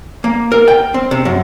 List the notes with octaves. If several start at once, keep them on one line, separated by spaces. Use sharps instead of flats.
A#3
A#4
G5
C4
C3
F#2